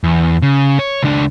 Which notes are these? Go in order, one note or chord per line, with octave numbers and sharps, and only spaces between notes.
E2
C#3
C#5
C#2 D4